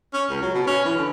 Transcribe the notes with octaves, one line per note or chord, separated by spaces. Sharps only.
C#4
C#2
F#3
B2
C#4
E3
D3